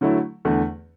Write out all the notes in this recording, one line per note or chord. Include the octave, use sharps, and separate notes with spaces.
D3 F#3 A3 E4
E2 D3 A3